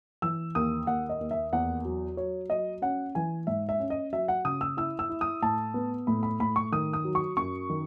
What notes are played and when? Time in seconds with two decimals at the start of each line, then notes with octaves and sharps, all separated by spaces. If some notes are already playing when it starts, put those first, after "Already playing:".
0.22 E3 E6
0.55 D#2 D#6
0.87 D#2 F#5
1.09 D#5
1.21 D#2
1.31 E5
1.53 E2 F#5
1.85 F#3
2.17 F#3 C#5
2.50 F#3 D#5
2.82 C#4 F#5
3.15 E3 G#5
3.47 G#2 E5
3.69 E5
3.80 C#4
3.90 D#5
4.13 F#3 E5
4.28 F#5
4.45 C#3 D#6
4.61 E6
4.77 E4 E6
4.99 E6
5.09 E4
5.21 D#6
5.42 A2 A5
5.74 B3
6.07 A2 B5
6.23 B5
6.40 A2 B5
6.56 C#6
6.72 D#3 D#6
6.93 D#6
7.05 F#3
7.15 C#6
7.37 F#2 C#6
7.70 D#3